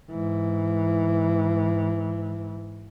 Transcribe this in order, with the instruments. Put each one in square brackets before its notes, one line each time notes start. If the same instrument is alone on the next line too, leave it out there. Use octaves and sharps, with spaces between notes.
[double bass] G#2 E3